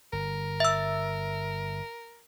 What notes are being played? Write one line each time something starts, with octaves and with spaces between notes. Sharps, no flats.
G1 A#4
E5 E6